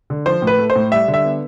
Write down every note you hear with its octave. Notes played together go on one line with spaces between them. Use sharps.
D3
F3 C5
A2
B4
A3
C5
A2
G3 E5
D3
E5
B3